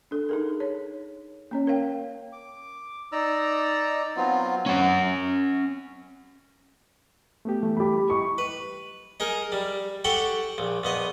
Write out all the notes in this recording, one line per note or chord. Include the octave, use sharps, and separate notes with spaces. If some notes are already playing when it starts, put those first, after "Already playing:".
D4 A4
D#4 G#4 A#4
C#5
A#3 C#4 C#5
A#4 C#5 F5 G5
D6
D#4 D5 A#5 E6
F#3 B3 C4 F4
C#4 F#5
A3 B3 G4
E3 G3 A3
G4 B5
E4 D#5 C#6
B4
D#4 G#4 A#4
G3
F#4 G4 A4 F#5 G5
A#1
A#1 B3 D#5